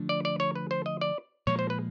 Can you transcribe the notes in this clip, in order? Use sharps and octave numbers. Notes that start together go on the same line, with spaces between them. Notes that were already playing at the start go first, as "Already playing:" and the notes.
Already playing: D3 F3 A3 D4
D5
D5
C#5
B4
C5
D#5
D5
A#2 F3 G#3 C#5
C5
B4